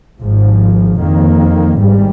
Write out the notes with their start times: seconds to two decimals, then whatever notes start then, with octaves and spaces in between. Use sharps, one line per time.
0.21 G#1 G#2 F3
1.00 F2 D#3 A#3
1.78 G#1 G#2 G3